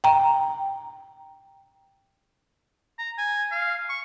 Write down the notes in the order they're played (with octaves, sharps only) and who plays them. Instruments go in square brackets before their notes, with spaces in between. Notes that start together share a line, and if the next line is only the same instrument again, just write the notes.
[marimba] G5 A#5
[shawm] A#5
G#5
F5
C#6